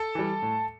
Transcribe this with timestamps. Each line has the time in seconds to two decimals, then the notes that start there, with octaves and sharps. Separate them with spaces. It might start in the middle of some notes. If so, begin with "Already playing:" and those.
Already playing: A4 A5
0.15 E3 G3
0.42 A2